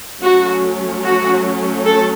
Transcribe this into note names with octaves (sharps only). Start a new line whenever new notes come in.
F#3 A3 C#4 F#4
F#4
A4